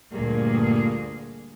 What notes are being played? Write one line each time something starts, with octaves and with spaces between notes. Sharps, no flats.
D2 G2 A#2 G3 A#3 G#4